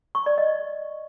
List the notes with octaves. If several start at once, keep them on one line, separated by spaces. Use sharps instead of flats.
C#6
D5
D#5